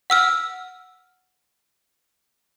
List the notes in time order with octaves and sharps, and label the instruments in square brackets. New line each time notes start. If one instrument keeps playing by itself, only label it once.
[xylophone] F#5 E6 F6